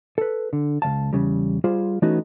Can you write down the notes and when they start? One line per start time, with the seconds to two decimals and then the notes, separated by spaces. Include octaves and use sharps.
0.18 A4 B4
0.53 D3
0.82 C#2 C#3 F5 A5
1.13 E2 A2 C#3 G3
1.64 G3 F4 G#4 C5
2.02 E3 A3 B3 C#4 D#4 F#4